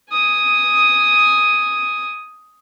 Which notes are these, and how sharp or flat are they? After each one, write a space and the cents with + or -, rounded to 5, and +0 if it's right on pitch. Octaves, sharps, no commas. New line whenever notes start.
G#5 +0 D#6 +5